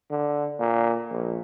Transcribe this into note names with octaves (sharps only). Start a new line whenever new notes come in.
D3
A#2
A#1